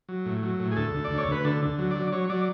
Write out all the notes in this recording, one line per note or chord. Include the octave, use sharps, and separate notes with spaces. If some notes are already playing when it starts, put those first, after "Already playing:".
F#3
A2
F#3
A2
G#4
D2 A4
D2
D5
D2
C#5
D2 B4
D3 A4
D3
F#3
D5
F#3
F#3 C#5
F#3 D5